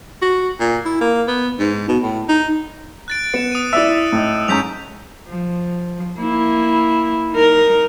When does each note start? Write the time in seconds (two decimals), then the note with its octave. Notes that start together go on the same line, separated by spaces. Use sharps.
0.22 F#4
0.60 A#2
0.85 E4
1.01 A#3
1.28 B3
1.59 G#2
1.88 B2
2.03 A2
2.29 D#4
3.08 F#6 A6 D7
3.34 B3 C#7 D7 E7
3.52 D#6 D#7
3.73 E4 D5 E5 E6
4.12 A2 D#4
4.48 G#2 C#4 A#5 G6 B6 F7
5.28 F3
6.19 A#3 E4
7.31 D#4 A#4